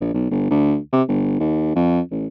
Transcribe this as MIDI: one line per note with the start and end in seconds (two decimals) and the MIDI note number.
0.01 0.10 34
0.14 0.26 35
0.31 0.48 31
0.50 0.77 38
0.93 1.02 48
1.08 1.39 31
1.40 1.73 39
1.75 2.01 41
2.11 2.27 33